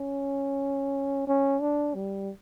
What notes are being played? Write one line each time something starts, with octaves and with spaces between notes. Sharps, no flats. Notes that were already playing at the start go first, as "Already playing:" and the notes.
Already playing: C#4
C#4
D4
G3